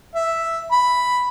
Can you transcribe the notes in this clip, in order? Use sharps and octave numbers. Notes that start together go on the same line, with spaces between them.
E5
B5